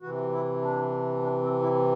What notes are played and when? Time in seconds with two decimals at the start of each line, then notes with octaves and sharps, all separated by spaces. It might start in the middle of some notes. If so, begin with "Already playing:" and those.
0.02 C3 E3 F#4
0.32 E4
0.62 D4
1.23 D4
1.43 C4
1.62 E4